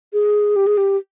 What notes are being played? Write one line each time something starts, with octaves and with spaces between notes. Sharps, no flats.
G#4
G4
G#4
G4